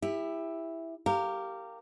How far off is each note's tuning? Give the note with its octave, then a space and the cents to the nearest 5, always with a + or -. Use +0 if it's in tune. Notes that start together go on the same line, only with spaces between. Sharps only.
E4 +0 G4 +30
G4 -5 A#4 -20 F5 +0